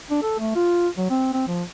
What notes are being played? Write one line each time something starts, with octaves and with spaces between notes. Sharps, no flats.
D4
A4
A3
F4
F#3
C4
C4
F3